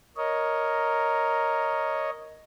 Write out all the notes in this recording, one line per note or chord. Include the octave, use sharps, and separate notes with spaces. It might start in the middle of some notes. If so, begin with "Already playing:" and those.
A#4 C#5 D#5